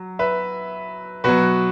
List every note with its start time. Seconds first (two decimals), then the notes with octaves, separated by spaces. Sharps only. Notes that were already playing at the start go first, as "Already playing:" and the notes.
Already playing: F#3
0.19 B4 E5
1.24 B2 F#3 F#4 B4